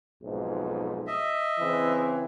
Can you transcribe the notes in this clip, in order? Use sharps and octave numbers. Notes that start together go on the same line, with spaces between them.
B1 F2 G#2
D#5 E5
C#3 E3 C4